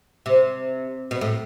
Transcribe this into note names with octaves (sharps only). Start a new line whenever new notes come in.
C3
B2
A2